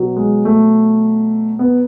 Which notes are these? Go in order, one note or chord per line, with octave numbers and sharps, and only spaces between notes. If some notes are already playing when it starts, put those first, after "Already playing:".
Already playing: B2 F#3
G#3
A3
B3